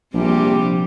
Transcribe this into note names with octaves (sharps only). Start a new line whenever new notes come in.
A#1 C3 G3 G4